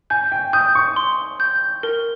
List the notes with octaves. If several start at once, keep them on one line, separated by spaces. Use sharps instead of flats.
G#5 G6
G5
D#6 G6
C#6
C6
G6
A#4